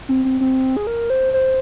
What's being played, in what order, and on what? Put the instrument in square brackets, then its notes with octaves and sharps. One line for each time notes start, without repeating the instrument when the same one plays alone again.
[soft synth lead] C4
C4
C4
G#4
A#4
C5
C5